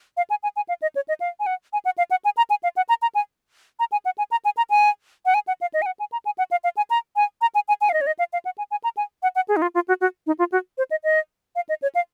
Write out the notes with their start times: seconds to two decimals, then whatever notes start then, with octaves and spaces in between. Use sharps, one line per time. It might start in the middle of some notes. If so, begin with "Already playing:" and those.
0.17 F5
0.30 G#5
0.43 G#5
0.56 G#5
0.69 F5
0.82 D#5
0.95 C#5
1.08 D#5
1.20 F5
1.40 G#5
1.46 F#5
1.73 G#5
1.85 F#5
1.98 F5
2.11 F#5
2.25 G#5
2.37 A#5
2.50 G#5
2.63 F5
2.77 F#5
2.89 A#5
3.02 A#5
3.15 G#5
3.79 A#5
3.92 G#5
4.05 F#5
4.18 G#5
4.31 A#5
4.45 G#5
4.57 A#5
4.70 G#5
5.26 F#5
5.34 G#5
5.48 F#5
5.61 F5
5.74 D#5
5.82 G#5
5.86 F#5
6.00 G#5
6.12 A#5
6.25 G#5
6.38 F#5
6.51 F5
6.64 F5
6.77 G#5
6.90 A#5
7.16 G#5
7.41 A#5
7.55 G#5
7.68 G#5
7.81 G#5
7.89 F5
7.94 D#5
8.01 C#5
8.07 D#5
8.19 F5
8.33 F5
8.45 F#5
8.58 G#5
8.71 G#5
8.84 A#5
8.97 G#5
9.23 F#5
9.36 F#5
9.48 G#4
9.56 D#4
9.62 F4
9.75 F4
9.88 F#4
10.01 F#4
10.27 D#4
10.39 F4
10.52 F#4
10.78 C5
10.91 D#5
11.04 D#5
11.56 F5
11.69 D#5
11.82 C#5
11.95 F5